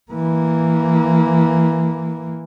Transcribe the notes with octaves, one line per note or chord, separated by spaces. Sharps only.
E3 A#3